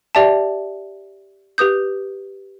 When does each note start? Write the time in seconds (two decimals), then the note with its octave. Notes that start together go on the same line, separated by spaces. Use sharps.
0.15 G4 D5 E5 G5 A5
1.58 G4 B4 D#6 G6